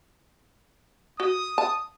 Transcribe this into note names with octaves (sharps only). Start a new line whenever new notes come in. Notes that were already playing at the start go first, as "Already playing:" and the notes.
F#4 D#6
A5